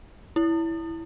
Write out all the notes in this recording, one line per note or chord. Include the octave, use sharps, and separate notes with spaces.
E4